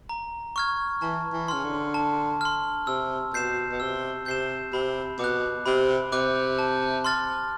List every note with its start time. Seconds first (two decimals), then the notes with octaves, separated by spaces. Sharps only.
0.09 A#5
0.56 C#6 F6 G#6
1.02 E3 A5
1.32 E3
1.48 C#3 C6 F6
1.64 D3
1.94 A5
2.41 C6 F6
2.87 C3 E6
3.33 B2 G6 C7 E7
3.72 B2
3.80 C3 E6
4.26 C3 G6 C7 E7
4.73 C3 B5
5.19 B2 D6 F#6
5.66 C3 B5
6.12 C3 D6 F#6
6.59 A5
7.05 C6 F6 A6